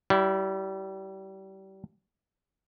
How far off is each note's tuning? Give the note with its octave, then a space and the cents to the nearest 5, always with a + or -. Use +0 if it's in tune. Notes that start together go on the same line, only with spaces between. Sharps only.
G3 -30 E4 +0